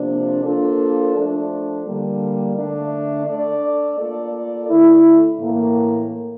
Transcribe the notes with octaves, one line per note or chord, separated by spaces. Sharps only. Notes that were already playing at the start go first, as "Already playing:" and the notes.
Already playing: C3 F3 A#3 D4
A#3 D4 F4 A4 C5
F3 A3 D4
D3 G3 A#3
D3 A3 D4
A3 D4 A4 D5
A#3 F4 A4 D5
D3 A3 E4
A2 E3 A#3